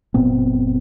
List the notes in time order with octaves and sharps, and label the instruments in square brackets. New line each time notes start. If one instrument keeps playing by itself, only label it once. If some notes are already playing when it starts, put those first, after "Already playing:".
[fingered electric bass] F#1 A#2 B3 C4